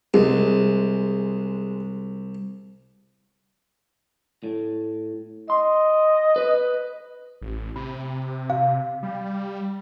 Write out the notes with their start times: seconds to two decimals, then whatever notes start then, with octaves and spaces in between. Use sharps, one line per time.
0.14 C2 G#3
4.44 A2
5.50 D#5 C6
6.36 B4
7.41 A1
7.76 C3 B5
8.50 F5
9.03 G3